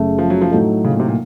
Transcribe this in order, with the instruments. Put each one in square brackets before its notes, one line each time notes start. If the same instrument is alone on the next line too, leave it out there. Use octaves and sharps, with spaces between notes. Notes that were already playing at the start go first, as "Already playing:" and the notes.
Already playing: [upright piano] F#1 F#2 C#3 A3
[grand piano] F3
F#3
F3
[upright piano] A2 F#3 A3 D#4 A4
[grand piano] C#3
A#2
C3
A#2